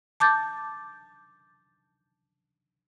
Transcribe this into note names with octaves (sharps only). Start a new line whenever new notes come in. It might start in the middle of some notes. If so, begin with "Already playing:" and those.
A5 D6 G6 A6